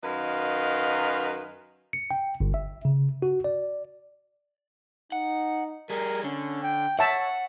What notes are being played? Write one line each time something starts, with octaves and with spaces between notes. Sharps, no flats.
F#2 D#3 B4 D#5 F5
C#7
G5
G1
E5
C#3
F#4
D5
D#4 F#5
G3 G#4 A#4
D3 C#4
G5
C#5 E5 F#5 A5